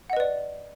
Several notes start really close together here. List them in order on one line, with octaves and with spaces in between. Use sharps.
F#5 D#5 B4 D5